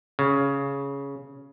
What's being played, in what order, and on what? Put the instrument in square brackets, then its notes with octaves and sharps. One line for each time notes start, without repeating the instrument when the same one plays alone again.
[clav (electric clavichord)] C#3